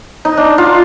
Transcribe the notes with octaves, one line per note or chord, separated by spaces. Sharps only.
D#4
D4
F4